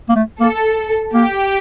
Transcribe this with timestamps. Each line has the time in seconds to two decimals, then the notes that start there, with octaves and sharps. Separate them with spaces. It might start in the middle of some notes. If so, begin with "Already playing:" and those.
0.09 A#3
0.16 A3
0.40 A#3 A4
1.13 A#3 G4